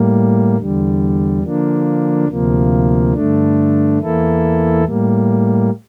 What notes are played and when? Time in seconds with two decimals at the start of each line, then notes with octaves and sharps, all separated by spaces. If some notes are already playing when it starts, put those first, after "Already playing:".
Already playing: A2 G3 A#3
0.58 E2 D3 G3
1.43 D3 F3 A#3 D4
2.28 D2 C3 F3 A#3
3.13 G2 D3 A3 D4
3.99 E2 E3 A#3 E4 A4
4.84 A2 G3 A#3